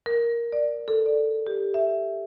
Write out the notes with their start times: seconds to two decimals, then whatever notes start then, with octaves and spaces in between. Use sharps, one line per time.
0.06 A#4
0.52 D5
0.88 A4
1.06 D5
1.47 G4
1.74 E5